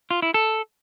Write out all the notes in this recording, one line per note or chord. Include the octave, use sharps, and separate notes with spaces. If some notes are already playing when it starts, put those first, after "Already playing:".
F4
E4
A4